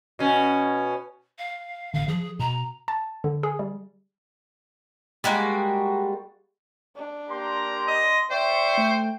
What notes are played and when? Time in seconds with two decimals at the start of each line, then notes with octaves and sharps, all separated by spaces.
0.19 B2 C#4
1.38 F5
1.94 A1 D3 F5
2.08 E3 F3 G#4
2.39 B2 A#5
2.88 A5
3.24 D3
3.43 G#4
3.59 G3
5.24 G3 G#3 A#3 F#4
6.96 D4
7.30 A#3 G4 A#5 C6
7.88 D#5
8.31 C5 D5 E5 G5 C6 C#6
8.78 A3